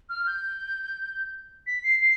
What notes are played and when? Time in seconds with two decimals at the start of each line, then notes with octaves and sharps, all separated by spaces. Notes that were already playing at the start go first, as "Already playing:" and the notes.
0.09 F6
0.26 G6
1.67 B6
1.84 C7
2.01 C7